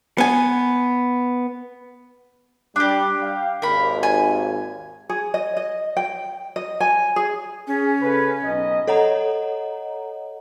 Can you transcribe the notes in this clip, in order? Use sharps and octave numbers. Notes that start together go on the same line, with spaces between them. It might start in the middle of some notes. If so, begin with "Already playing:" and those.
B3 G#5
G3 D4 G4
F5 G5
G#1 D#2 A#4 B5
G#5
G#4
D#5
D#5
G5
D#5
G#5
G#4
C#4 G#4
C#3 A4 B4
B1 D#5
A4 C#5 D#5 F#5 A#5